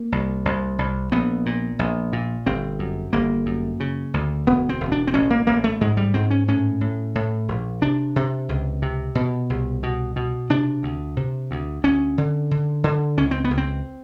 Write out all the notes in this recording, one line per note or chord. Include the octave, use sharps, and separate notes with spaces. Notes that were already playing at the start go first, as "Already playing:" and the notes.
Already playing: A#3
C2
C2
C2
A#1 B3
A#2
A#1
A#2
G1 C4
F#2
G1 A#3
F#2
C#3
D2
E1 B3
C4
E1
D4
C4
A1 C#4
A#3
A1 A#3
A3
G#2 G#3
G3
G#2 C4
C#4
A2 C#4
A2
A2
A#1
C3 D4
C3
C#2
C3
B2
C2
B2
B2
C3 D4
D2
C3
D2
D2 C#4
D3
D3
D3
C#2 C#4
C4
B3
C#2
C4